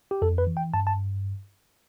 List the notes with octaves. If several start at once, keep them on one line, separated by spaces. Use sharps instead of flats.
G4
F2 A4
B4
E3
G5
G2 A5
A5